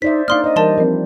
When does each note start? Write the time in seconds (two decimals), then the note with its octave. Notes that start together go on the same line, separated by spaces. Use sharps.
0.02 D#4 C5 D5 E5 B6
0.28 A#3 D4 D#4 D5 F5 C6 D#6 F6
0.44 C5 D5 D#5
0.56 E3 G3 A#4 D5 A5 C6
0.78 F3 C4 A#4